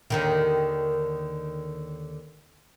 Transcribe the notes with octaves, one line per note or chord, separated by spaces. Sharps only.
D#2 D3 D#3